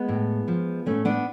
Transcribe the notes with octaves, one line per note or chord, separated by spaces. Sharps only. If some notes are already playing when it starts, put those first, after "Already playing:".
Already playing: G#3 B3
A2
F3
A2 A3 C#4
B3 D4